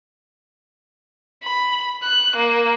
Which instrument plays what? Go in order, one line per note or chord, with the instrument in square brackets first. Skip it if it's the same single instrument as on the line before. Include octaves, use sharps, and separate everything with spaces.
[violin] B5
F#6
A#3